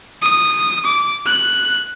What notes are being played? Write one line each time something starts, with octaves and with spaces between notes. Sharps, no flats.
D#6
D6
F#6